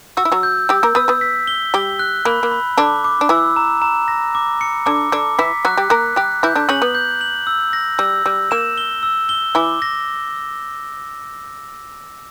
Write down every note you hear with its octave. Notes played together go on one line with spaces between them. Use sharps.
F#4 E6
E4
F#3 F#4
G6
G3 G4 E6
A#3 A#4
B3 B4 E6
B3 B4
B6
G7
G3 G4 G7
F#6
A#3 B5
A#3
B5
D3 D4 D6
D6
D4
E3 E4 E6
A#5
A#5
A#6
D6
C#7
D3 D4 D6
D3 D4 D6
E3 E4 B6
F#3 F#4 F#6
G3 G4
A#3 A#4 F#6
G3 G4 F#6
E3 E4 G6
D3 D4
C#3 C#4 F#7
B3
G6
F#7
E6
A#6
G3 E6
G3 E6
A#3 E7
G7
E6
G7
E3 E4 D6
A#6